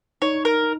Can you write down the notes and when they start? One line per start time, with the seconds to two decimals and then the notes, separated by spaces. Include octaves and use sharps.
0.22 D#4 C#5
0.45 A#4